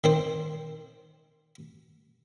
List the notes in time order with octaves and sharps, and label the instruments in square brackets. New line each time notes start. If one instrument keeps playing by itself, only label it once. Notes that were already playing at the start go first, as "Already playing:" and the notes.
[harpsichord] D#3 C4 C5